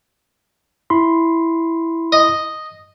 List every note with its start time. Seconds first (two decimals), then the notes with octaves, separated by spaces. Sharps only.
0.90 E4 B5 C6
2.12 D#5